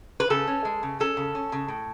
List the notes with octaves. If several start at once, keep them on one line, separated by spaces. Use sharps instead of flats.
B4
C#3 A4
C#4
G#3
C#3
C#4 A4
C#3
C#4
C#3
A2